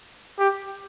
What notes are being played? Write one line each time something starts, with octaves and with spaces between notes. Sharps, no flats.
G4